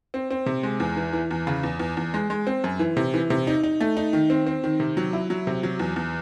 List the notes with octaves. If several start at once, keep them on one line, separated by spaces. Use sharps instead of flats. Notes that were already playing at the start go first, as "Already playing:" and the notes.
C4
C4
C3
G#3
E2
E3
E3
E2
C#3
E2
E2
E2
G#3
G#3
C4
F#2
E3
C3
E3
C3
D#4
D#4
A3
D#4
D#3
C4
C4
D#3
C3
F#3
E4
F#3
C3
F#3
E2
E2